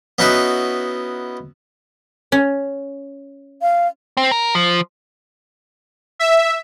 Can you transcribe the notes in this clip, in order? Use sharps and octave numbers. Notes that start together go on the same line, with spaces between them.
B3 C#4 D#4 E4 F#4 B4
C#4
F5
C4
A#4
F3
E5